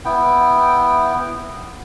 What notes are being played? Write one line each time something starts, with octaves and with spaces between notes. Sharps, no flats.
B3 E4 G5